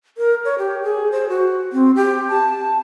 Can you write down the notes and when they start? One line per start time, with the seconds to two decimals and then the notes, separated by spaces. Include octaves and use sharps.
0.18 A#4
0.45 C#5
0.58 G4
0.83 G#4
1.12 C5
1.29 F#4
1.73 C4
1.96 G4
2.29 A5